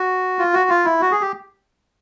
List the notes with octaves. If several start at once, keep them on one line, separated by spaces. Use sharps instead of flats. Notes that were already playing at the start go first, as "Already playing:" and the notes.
Already playing: F#4
F4
F#4
F4
E4
F#4
G#4
G4